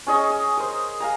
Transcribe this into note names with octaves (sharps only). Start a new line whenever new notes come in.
C#4 G#4 D#5 C#6
D#6
A#4 C5
F5 G#5 A#5